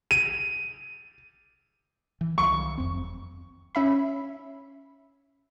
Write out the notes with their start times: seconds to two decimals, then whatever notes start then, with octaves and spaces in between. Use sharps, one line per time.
0.11 D#7
2.21 E3
2.38 C2 D#3 F#3 C#6
2.78 F1 F2 C4
3.75 C#4 E5 B5